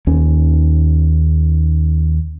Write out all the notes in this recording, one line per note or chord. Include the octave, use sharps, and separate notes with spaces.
D#2 C#4